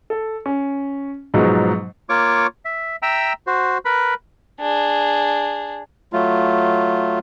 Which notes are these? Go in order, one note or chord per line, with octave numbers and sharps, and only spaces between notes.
A4
C#4
G#2 B2 F3 F#3 G#3 D#4
A#3 F4 C#5 C#6 D6
E5
E5 G5 A#5 E6
F#4 C5
A#4 B4 B5
D4 G#4
F#3 A3 F4